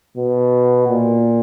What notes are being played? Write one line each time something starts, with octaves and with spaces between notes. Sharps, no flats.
B2
A#2